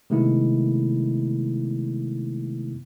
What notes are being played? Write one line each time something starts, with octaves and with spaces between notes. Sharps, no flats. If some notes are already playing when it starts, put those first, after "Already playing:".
C3 D#3 G#3 A3 B3 E4